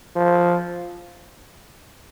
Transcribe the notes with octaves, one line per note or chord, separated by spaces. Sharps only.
F3